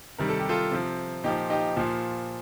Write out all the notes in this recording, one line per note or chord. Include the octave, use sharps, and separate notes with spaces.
C3 D#3 G3 A#4
A4
G4
F4 A4
C3 F3
A#2 F3 D#4 G4
D#4 G4
A#2 F3